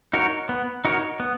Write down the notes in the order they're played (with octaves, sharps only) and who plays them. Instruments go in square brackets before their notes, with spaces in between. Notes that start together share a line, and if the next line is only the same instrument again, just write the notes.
[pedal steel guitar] D#4 F#4 A#4 C#5
B3
D#4 F#4 A#4 C#5
B3